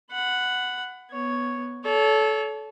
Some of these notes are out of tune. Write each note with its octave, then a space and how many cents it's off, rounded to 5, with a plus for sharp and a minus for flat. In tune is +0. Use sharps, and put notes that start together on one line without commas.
F#5 +0 B5 +25
B3 -10 C#5 +0
A4 -20 C#5 +35